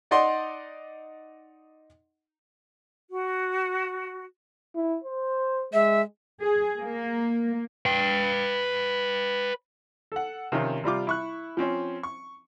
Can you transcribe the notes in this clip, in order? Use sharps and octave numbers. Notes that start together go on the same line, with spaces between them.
D#4 D5 D#5 F#5 C6
F#4
E4
C5
G#3 E5
G#4
A#3
B4 G5
A4 F#5
C3 D#3 F3 C#4 F4
C3 G3 F4 D6
E4 C#6 F#6
F3 C4 C#4
C#6